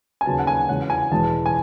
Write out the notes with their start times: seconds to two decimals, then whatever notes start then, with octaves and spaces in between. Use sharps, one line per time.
0.21 G#5
0.26 D#2 C#3 F#3 B3 A5
0.39 F#5
0.47 G#5
0.69 E2 C#3 G#3 C#4 F#5
0.90 G#5
1.11 E1 E2 B2 G#3 A5
1.46 G#5